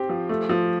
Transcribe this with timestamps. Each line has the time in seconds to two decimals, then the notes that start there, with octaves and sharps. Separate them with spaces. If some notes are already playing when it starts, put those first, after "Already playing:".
Already playing: C4 G4
0.09 F3
0.29 A3
0.49 F3